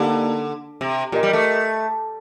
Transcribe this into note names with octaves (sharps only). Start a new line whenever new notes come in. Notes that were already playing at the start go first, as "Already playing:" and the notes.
Already playing: D3 A#3 D#4 G4
C3
A#2 G4 A#4 D#5
G3
A3